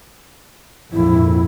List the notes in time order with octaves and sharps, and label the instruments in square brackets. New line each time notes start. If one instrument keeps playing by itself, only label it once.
[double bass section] A#1 F2 G#2 [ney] E4